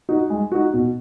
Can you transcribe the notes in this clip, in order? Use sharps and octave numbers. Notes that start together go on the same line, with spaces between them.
D#4 F#4
G#3
D#4 F#4
B2